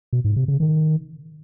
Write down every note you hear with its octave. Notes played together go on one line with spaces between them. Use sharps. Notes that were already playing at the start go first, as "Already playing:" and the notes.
B2
G#2
C3
C#3
D#3